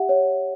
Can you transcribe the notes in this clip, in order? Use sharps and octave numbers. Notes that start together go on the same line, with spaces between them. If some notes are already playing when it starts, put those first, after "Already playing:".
Already playing: G4 E5 F#5
C#5